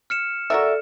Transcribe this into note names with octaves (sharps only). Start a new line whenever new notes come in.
F6 C#7 E7
F#4 A4 A#4 D5 E5